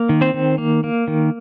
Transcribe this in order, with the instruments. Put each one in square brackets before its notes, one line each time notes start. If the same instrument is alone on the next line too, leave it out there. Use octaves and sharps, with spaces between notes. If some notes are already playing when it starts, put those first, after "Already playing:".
Already playing: [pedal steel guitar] A#3
D#3
C4 C5
D#3
A#3
A#3
D#3